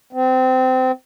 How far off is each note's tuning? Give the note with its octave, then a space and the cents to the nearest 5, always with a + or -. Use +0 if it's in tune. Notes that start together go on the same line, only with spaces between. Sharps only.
C4 -25